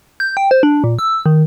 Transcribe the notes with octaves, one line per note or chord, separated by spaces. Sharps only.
G6
G5
C5
D4
A#2
E6
D#3